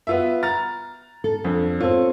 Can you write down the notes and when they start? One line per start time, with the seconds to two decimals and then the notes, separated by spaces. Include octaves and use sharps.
0.07 B3 F4 E5
0.43 A#5 F6 A6
1.24 A4
1.44 F2 D4
1.81 C4 F4 A4 C#5